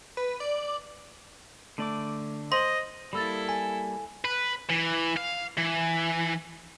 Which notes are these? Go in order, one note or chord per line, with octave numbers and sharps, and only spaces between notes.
B4
D5
D3 A3 D5 D6
C5 D#5 C6 F#7
G3 A#3 E4 A4 B5 E6 A6
G#5
B4
E3
F5
E3